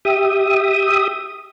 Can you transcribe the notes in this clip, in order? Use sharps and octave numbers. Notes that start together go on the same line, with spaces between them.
G4 E5 D#6